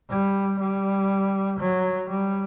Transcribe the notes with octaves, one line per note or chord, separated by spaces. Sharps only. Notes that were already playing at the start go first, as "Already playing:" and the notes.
G3
G3
F#3
G3